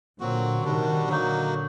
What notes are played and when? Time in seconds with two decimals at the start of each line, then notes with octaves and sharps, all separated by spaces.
0.19 A#2 D3 F#3 C4 F#4
0.64 C3 D#3 G3 D4 F#4
1.09 A#2 D3 F#3 A#3 D#4 F#4